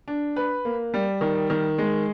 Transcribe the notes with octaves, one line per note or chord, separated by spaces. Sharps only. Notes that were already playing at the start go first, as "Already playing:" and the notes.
D4
B4
A#3
G3
D#3
D#3
G#3